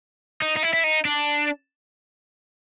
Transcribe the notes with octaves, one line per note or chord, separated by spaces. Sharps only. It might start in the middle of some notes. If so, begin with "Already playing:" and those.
D#4
D#4
E4
E4
D#4
D4